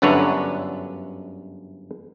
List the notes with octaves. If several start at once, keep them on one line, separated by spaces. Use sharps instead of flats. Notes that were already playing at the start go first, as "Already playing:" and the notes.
G1 F#2 D3 D4 B4 C#5